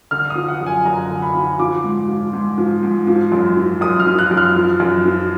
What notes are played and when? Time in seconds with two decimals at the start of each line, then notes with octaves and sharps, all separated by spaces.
0.11 D3 F6
0.30 D#6
0.35 F3
0.48 F#5
0.61 F#2
0.67 G#5
0.85 F#2 A#5
1.10 D3
1.22 B5
1.35 F3
1.59 F3 D6
1.84 G#2
2.09 F3
2.33 G#2
2.58 F3
2.83 G#2
3.07 F3
3.32 F#2
3.57 F3
3.81 F#2 D#6
4.00 F6
4.07 F3
4.19 F#6
4.31 F#2
4.37 F6
4.56 F3
4.80 F#2
5.05 F3